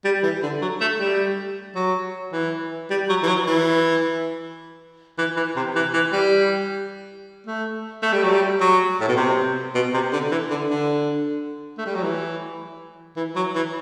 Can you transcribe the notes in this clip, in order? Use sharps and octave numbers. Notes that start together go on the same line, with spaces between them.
G3
E3
D3
F#3
A3
G3
F#3
E3
G3
F#3
E3
F#3
E3
E3
E3
C3
E3
E3
G3
A3
A3
G3
F#3
G3
F#3
A2
B2
C3
B2
C3
D3
E3
D3
D3
A3
G3
F#3
E3
E3
F#3
E3